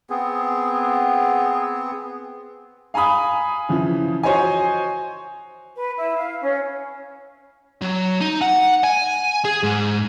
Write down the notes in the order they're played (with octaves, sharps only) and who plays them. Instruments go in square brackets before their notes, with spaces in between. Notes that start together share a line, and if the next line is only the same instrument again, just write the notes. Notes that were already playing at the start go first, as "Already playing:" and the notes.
[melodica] B3 C4 G#4
[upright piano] F5 G#5 A#5 B5 D#6
C#3 E3 F3
F#4 C5 C#5 D#5 G#5
[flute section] B4
E4
F5
C#4
[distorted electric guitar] F#3
D#4
F#5
G#5
G#4
G#2